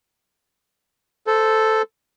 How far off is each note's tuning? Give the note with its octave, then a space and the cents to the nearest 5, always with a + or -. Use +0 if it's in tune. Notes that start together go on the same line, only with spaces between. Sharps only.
A4 +0 C5 -15